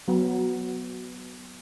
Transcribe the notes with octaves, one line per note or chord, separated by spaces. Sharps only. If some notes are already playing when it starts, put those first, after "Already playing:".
F#3 B3 F#4